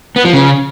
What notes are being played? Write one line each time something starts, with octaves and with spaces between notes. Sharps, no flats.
B3
F3
C#3